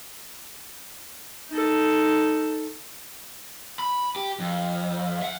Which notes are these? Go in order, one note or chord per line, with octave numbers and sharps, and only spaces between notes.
D#4 A4
B5
G4
F2
E5 F#5